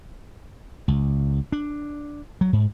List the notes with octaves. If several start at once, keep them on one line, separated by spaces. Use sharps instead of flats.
C#2
D4
F#3
G#2